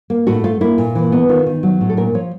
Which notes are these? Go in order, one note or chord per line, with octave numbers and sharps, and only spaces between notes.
A#3
A2 F#4
A3 F4
A#3 E4
A#2
E3
B3
D#3 F4
D#3
F#3
A2
A4
A#2 A#4
F3 C#5